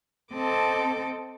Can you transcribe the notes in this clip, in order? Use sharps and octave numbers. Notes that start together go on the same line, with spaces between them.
C4 A4 D#5 A5 D6